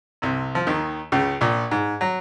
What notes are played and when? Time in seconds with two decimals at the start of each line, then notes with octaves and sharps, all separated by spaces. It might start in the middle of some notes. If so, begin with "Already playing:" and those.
0.22 C2 C3
0.55 F3
0.67 D#2 D#3
1.12 C#2 C#3
1.41 A#1 A#2
1.71 G#2
2.01 F#3